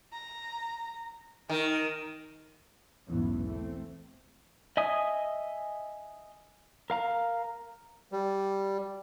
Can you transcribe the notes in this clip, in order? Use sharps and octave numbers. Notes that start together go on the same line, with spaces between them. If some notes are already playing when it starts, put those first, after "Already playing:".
A#5
D#3 A#4
B1 E2 G#2 E3 B3 C#4
A3 C4
D#5 E5 G#5 D#6
A#4 F5 A#5
G3